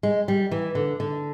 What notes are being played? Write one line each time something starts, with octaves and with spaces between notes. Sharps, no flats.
G#3
G3
E3
D3
D3